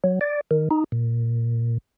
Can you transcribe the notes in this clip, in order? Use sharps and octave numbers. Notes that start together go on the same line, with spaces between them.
F#3
D5
D#3
D#4
A#2